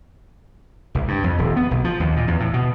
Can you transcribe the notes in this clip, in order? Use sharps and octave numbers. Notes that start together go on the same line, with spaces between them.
C2
G2
F2
D#1
B3
B1
F3
D#2
A#2
E2
A2
B2